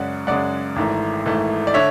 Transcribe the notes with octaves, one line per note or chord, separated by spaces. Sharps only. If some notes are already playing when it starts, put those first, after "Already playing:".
Already playing: F#2 C#3 G#3 D5 F#5
F#2 C#3 G#3 D5 F#5
G#1 G#2 E3 A3
G#1 G#2 E3 A3
D5
D3 C#5 E5